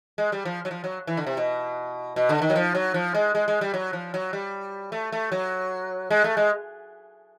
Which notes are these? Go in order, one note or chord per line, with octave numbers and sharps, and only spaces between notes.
G#3
G3
F3
F#3
F3
F#3
E3
D3
C3
B2
B2
D3
D#3
F#3
F3
F#3
F3
G#3
G#3
G#3
G3
F#3
F3
F#3
G3
A3
A3
F#3
G#3
A3
G#3